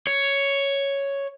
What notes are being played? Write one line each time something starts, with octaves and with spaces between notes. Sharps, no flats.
C#5